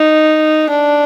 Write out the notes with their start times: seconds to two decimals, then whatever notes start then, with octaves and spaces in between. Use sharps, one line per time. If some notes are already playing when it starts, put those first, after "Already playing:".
Already playing: D#4
0.70 D4